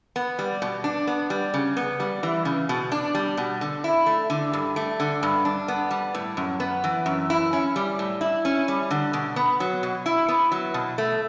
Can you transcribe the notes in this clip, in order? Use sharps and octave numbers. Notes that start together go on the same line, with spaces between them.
B3
G3
B2
D4
B3
G3
C#3
B3
G3
E3
C#3
B2
D4
G3
B2
D3
E4
A3
D3
G2
A3
D3
G2
D4
B3
G3
A2
F#2
B3
E3
F#2
E4
C#4
G3
A2
E4
C#4
G3
D3
B2
B3
F#3
B2
E4
B3
F#3
B2
A3